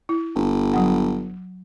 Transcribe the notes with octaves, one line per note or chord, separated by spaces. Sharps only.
E4
G1
F#3 F#5